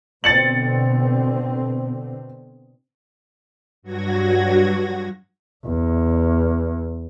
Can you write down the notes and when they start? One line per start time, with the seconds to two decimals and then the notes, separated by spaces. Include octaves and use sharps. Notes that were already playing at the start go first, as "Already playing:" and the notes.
0.24 B2 D3 C4 A6 C#7 F#7
3.82 G2 F#3 F#4 G#6 A#6
5.67 E2